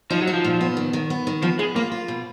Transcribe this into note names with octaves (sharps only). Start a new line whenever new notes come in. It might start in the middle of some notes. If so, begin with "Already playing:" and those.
F3 D#4
F#3
D#4
F3
A#2
B3
D#3
D#3
B3
D#3
F3 B3
G#3 B3
A#3 F4
F4
B2